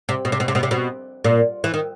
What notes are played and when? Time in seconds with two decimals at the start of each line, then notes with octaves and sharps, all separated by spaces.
0.09 C3
0.25 B2
0.32 C3
0.40 B2
0.48 C3
0.55 B2
0.63 C3
0.71 B2
1.24 A#2
1.64 E3
1.74 D#3